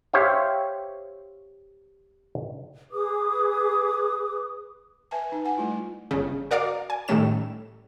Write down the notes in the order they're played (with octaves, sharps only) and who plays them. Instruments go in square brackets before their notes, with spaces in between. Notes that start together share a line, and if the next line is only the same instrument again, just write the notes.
[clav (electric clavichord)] G4 C5 C#5 E5 F5
[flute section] G#4 B4 D6 D#6
[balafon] B4 E5 G#5 A5
D#4 B4
F#5 G#5
G3 A3 E4 F4
[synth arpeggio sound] G1 C#3
F#4 A#4 D5 F5 D6
G#5
A2 D#3 G3 A3 C#4 E7